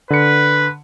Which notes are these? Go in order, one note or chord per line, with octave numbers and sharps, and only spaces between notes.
D3 B4 C#7